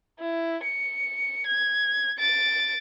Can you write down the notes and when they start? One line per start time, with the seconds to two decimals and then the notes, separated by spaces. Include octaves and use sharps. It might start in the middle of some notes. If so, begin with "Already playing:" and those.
0.20 E4
0.63 C#7
1.47 G#6
2.19 A6 D7